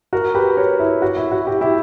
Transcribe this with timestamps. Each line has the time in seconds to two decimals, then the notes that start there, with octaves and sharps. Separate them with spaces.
0.13 F#4 A#4
0.35 G4 B4
0.57 A#4 C#5
0.79 E4
1.02 F#4
1.17 E4
1.32 F#4
1.46 E4 G4
1.61 E4 G4